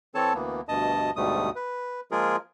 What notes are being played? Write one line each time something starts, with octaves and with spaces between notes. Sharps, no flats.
E3 C4 A4 C#5 A5
D2 E3 A#3 B3
D2 G2 B2 D#5 A5 D#6
D2 G#2 B2 G3 A3 D#6
B4
F3 G#3 A#3 F4 G#4 A#4